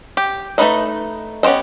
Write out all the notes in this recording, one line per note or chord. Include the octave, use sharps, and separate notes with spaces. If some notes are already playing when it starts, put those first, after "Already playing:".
G4
A3 C#4 D#4 B4 D#5
B3 C#4 G4 C5 D#5